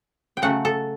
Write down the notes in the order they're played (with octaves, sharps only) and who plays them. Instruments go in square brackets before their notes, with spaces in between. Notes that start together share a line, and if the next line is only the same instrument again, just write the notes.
[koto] G5
C#3 F#3 A3 F#5
A4